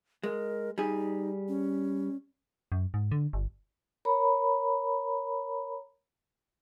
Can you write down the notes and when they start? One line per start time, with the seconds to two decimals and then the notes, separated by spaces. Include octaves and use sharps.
0.24 G#3 A#4
0.78 G3 D#4 G#4
1.48 C#4
2.72 F#2
2.94 G#2
3.11 D3
3.33 G1
4.05 A#4 C#5 A#5 B5